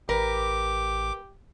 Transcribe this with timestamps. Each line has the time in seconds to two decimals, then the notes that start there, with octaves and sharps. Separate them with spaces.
0.09 A1 G4 A#4 B4 D6